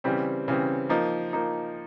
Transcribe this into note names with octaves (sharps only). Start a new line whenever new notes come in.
C#3 E3 G3 C4
C#3 E3 G3 C4
F3 A#3 D#4
F3 A#3 D#4